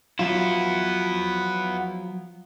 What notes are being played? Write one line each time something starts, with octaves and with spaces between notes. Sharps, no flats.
F3 F#3 B3 E4 F4